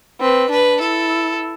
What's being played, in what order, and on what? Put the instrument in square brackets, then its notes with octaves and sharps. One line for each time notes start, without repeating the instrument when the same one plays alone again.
[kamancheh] C4 [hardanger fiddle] B4
[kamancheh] D4 [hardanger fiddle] B4
[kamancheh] E4 [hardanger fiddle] A4